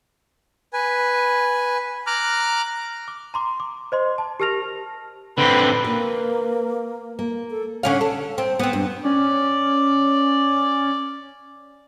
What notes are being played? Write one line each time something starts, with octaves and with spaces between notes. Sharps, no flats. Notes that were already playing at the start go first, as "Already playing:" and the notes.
B4 G#5
A#5 D6 F6 F#6
D6
A#5 C6 D6
D6
C5 D#5 C6
A5
G4 A#4 A5 F6 A#6 F7
D3 C4 B4
A#3 A#4 B4
A#3
A4
D3 C#4 F5
A4
C4
B3 C4
G2
C#4 D5